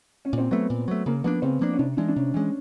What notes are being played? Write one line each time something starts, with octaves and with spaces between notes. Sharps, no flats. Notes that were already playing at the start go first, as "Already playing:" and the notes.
C#4
A#2 C4
F#3 A3 B3
A#2
F#3 A3
C#3 A#3
F3 A#3 B3 D4
C#3 C4
F3 A#3 D4
C#4
C3 D4
E3 G#3 D4
D4
C3 C#4
E3 G#3 C#4